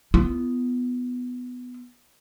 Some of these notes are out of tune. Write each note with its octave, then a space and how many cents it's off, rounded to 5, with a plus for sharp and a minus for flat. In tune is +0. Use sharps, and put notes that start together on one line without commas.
B3 +10 F4 -45